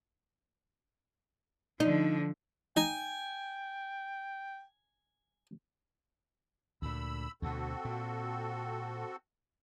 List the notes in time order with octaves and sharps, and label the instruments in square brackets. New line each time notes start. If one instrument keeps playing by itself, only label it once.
[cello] D3 F3 [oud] D#4
[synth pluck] D#4 [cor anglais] G5 [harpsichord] G#5
[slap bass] D2 A#2 [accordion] B5 E6
[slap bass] D2 B2 [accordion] C4 F#4 A4
[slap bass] A#2